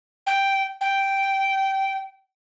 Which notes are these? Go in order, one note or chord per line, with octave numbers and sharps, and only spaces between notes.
G5
G5